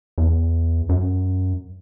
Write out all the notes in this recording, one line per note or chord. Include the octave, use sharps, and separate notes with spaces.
E2
F#2